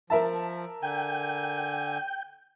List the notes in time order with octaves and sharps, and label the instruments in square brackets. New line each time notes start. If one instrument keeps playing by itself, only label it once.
[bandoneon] F3 [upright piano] A#4 E5 A5
[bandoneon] D3 G#5 [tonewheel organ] G5